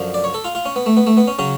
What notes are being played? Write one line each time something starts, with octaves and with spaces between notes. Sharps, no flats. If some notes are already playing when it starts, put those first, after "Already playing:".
Already playing: F#2 D3 F3
D5
C#5
A4
F4
F4
C#4
B3
A3
B3
A3
B3
C#4
C#3 F#3 C#4